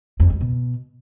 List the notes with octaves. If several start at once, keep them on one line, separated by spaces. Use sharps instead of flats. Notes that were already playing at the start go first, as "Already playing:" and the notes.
F2
G#2
B2